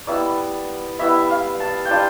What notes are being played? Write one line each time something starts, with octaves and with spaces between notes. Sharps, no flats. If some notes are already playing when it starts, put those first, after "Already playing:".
G3 B3 E4 D5
G3 B3 E4 E5
F5
A5
G5
G3 D4 F4 A5